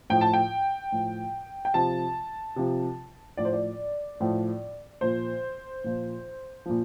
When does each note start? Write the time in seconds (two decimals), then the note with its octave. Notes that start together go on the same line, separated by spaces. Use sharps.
0.10 A2 F3 G5
0.21 A5
0.33 G5
0.92 A2 F3
1.65 G5
1.74 C3 F3 A5
2.56 C3 F3
3.37 A2 F3 D5
3.45 C5
3.53 D5
4.20 A2 F3
5.01 A#2 F3 C5
5.84 A#2 F3
6.66 A#2 F3